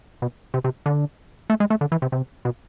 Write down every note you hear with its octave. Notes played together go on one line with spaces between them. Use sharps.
B2
C3
C3
D3
A3
G#3
A3
D3
E3
C3
C3
B2